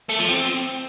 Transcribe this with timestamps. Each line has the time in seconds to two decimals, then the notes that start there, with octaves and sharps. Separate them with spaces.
0.10 A3
0.19 F3
0.29 C4